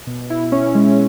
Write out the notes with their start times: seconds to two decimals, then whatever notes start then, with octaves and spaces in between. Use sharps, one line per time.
0.07 B2
0.30 E4
0.52 C#4
0.75 G#3